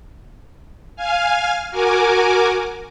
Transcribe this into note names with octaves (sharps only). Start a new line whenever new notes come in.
F5 G#5 F6
F#4 A#4 G#5 D6